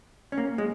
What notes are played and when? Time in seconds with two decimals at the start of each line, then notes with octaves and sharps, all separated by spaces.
0.32 C#4
0.38 A#3
0.58 G#3